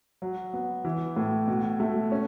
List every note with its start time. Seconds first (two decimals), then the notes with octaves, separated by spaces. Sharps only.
0.22 F#3
0.54 B3
0.85 E3
1.16 A2
1.48 B2
1.80 A3
2.12 C#4